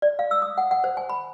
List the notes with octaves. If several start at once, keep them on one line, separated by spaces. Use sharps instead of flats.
D5
F5
E6
D#6
F#5
F#5
C5
G#5
B5